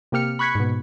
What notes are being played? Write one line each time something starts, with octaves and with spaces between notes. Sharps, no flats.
C3 A#3 G4 F6 C#7
B5 C#6 F#6 G#6 B6 C#7
G#2 B2